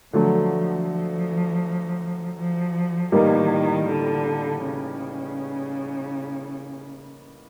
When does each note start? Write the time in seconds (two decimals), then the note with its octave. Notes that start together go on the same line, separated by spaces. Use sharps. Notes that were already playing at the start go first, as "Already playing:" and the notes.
0.13 D3 F3 F#3 A3
0.88 F3
2.38 F3
3.12 A2 D#3 E3 G3 A#3 D#4
3.87 D3
4.62 C#3